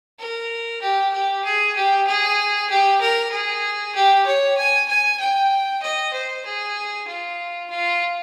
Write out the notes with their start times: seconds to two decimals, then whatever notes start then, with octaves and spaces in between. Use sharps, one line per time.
0.19 A#4
0.81 G4
1.13 G4
1.44 G#4
1.75 G4
2.07 G#4
2.69 G4
3.01 A#4
3.32 G#4
3.95 G4
4.26 C#5
4.57 G#5
4.88 G#5
5.20 G5
5.82 D#5
6.13 C5
6.45 G#4
7.07 F4
7.70 F4